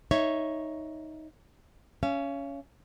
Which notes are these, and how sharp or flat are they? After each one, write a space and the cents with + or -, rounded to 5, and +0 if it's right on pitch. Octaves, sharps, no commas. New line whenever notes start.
D#4 +10 C#5 +0 E5 +0
C#4 +15 F5 -30